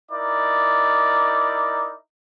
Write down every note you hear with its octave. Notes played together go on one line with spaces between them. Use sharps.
D#4 E4 A#4 D5